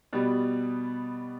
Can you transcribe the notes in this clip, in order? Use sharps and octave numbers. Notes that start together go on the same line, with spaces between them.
B2 G3 B3